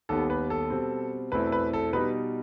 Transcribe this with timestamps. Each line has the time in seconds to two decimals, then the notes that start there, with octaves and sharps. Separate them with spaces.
0.09 D#2 D#3 G3 B3 A4
0.30 B4
0.50 A4
0.70 B2 G3 C4
1.32 E2 B2 A3 C4 E4 B4
1.52 B4
1.73 A4
1.93 B2 G3 D#4 B4